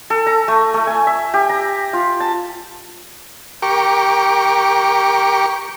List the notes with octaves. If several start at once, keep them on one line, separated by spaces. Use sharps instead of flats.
A4
A#5
A3
A3
G#5
E5
G4
A#5
F4
A5
G4 A#4 C#6 D6